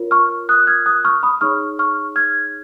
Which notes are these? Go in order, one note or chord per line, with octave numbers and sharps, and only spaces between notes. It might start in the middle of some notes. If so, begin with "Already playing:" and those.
Already playing: F4 A#4 C#5
C#6 F6
D#6 F#6
F6 G#6
D#6 F#6
C#6 F6
B5 D#6
D#4 G#4 C#5 C#6 F6
C#6 F6
F6 G#6